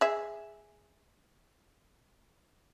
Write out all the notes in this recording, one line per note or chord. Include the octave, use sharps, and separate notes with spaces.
G#4 E5